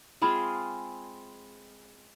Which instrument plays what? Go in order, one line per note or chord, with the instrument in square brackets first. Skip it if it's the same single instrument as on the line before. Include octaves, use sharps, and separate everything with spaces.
[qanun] G#3 C4 F4 G#4 [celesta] B5